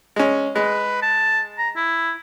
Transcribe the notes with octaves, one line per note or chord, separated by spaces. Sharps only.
G#3 C#4
G#3 B4
A5
A#5
E4